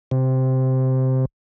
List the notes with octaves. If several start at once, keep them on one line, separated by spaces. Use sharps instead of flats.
C3